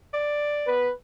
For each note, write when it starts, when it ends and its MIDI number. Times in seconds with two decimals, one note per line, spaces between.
0.13 0.71 74
0.66 0.91 59
0.66 0.91 71